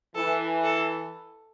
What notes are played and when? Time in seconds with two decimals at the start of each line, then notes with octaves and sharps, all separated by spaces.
0.16 E3 A4
0.64 A4